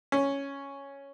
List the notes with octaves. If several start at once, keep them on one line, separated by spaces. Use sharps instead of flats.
C#4